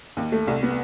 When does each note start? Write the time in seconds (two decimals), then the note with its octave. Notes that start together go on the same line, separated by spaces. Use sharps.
0.17 D#2
0.32 A3
0.47 C2
0.63 B3